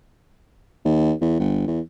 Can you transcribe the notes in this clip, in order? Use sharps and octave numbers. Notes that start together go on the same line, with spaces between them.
D#2
E2
G1
E2